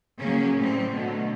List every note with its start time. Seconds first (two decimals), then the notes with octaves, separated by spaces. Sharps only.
0.20 C#3 F#3 A#3 C#4
0.60 A2 G3 A3 C4
0.93 B2 D3 F#3 A3